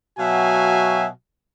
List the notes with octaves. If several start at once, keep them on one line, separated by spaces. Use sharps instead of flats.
B2 F#3 F#4 E5 F5 G#5